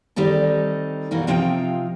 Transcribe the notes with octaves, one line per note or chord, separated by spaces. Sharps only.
D#3 G3 C4 D#4 A4
B2 E3 A#3 D#4 F#4
C3 F3 C4 D#4 F4 G5